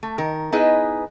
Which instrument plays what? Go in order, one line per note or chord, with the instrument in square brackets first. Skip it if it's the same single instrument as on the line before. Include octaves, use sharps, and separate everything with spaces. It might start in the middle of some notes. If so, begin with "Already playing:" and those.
[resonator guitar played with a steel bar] A3
D#3 A#4
B3 D#4 E4 G#4 B4 D#5